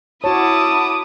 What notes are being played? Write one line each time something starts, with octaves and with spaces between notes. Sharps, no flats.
E4 F#4 C#5 A5 D6 D#6